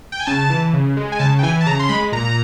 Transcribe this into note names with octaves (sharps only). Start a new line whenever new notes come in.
G5
G#5
C#3 A5
E3
C#3
G#3
G#5
C#3 A5
G5
E3 G#5
A5
C#3 A#5
C6
G#3 B5
A#2 A#5
A#5